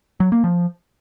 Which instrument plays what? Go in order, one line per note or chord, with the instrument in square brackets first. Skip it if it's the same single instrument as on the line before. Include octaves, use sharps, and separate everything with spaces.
[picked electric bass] F#3
A#3
F3